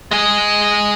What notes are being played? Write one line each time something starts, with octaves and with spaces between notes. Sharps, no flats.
G#3 G#4